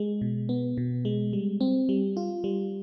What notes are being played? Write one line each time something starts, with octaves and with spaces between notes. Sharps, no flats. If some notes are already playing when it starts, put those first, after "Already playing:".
Already playing: G#3
B2
B3
B2
G#3
G3
C4
G3
F4
G3